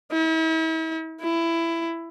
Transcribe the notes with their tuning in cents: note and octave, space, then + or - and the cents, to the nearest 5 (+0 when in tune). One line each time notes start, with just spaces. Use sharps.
E4 -40
E4 +15